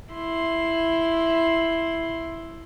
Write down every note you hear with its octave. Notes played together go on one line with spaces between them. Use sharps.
E4 C6